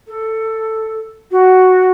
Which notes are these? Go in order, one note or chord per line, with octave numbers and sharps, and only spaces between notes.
A4
F#4